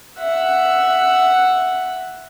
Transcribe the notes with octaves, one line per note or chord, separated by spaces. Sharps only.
E5 F#5